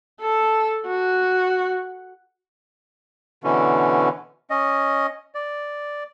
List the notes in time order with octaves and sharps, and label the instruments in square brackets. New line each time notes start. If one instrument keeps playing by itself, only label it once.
[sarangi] A4
F#4
[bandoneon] B2 D3 E3 C#4
C#4 D#5
D5